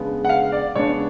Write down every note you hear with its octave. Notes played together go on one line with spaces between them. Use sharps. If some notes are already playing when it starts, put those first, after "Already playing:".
Already playing: C#3 G#3 B3 D4
F#5
F5
D5
C#3 G#3 B3 D4 C#5